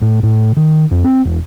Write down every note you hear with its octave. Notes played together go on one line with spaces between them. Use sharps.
A2
A2
D#3
F2
C4
E1